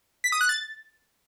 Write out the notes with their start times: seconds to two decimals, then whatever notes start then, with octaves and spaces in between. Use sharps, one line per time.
0.24 B6
0.32 D#6
0.41 F#6
0.49 A6